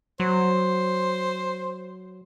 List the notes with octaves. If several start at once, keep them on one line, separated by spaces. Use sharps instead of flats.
F#3 C5